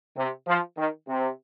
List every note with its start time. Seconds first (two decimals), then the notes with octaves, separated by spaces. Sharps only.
0.17 C3
0.47 F3
0.77 D#3
1.08 C3